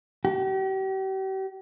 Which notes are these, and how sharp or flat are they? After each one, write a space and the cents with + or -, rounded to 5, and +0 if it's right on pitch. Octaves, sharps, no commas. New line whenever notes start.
G4 -40